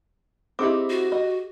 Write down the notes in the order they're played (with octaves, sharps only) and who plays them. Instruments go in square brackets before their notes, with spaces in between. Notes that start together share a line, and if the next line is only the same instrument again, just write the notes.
[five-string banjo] C4 D#4 E4 [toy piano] G4 G#4 D6
[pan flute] F#4
[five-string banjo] D#5